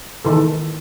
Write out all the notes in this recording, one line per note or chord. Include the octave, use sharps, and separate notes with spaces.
D#3 E3 A4